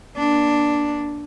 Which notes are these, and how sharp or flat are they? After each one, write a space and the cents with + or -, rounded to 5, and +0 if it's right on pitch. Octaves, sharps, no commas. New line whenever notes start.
A#3 +30 D4 +0